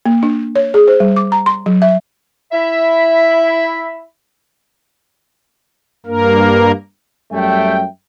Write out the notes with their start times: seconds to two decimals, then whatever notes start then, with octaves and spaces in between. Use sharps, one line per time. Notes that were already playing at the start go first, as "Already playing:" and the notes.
0.06 A#3
0.23 D4
0.56 C#5
0.74 G#4
0.88 C5
1.00 G3
1.16 D6
1.32 A#5
1.46 C6
1.66 F#3
1.82 E5
2.52 E4 E5 B5
6.06 G2 A#3 A#4
7.32 F#2 G3 A3 E5 G5